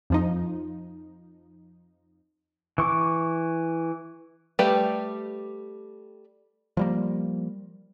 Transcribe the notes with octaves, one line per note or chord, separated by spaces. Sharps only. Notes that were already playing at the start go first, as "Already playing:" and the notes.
F2 F3 D#4
E3 C#6 D6
G3 A3 G4 B4 G5
F3 G3 A#3